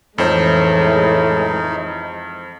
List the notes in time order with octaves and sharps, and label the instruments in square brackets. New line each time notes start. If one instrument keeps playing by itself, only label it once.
[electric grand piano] F2 C5 [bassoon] A2 [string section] E3 G#3 [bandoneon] D#4